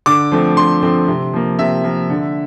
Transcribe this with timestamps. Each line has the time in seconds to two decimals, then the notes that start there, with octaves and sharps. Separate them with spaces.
0.06 D3 D6
0.32 F3 A3 C4
0.56 D3 C6
0.82 F3 A3 C4
1.08 C3
1.33 F3 A#3
1.59 C3 E5
1.84 F3 A#3
2.10 D3